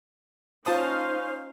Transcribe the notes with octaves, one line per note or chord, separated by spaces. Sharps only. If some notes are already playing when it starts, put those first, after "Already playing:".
C#4 D#4 F4 C5 F5 A5 D#6